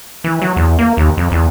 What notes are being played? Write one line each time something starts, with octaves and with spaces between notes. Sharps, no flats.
E3
F#3
E2
A#3
D#2
F2
E2